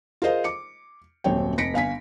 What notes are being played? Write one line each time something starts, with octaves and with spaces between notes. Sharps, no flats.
F4 G#4 A#4 C5 D#5 F5
D6 C#7
D#1 F#2 C4 C#5 G5
F1 A#6 B6 C#7 D7
G1 F5 G#5 B6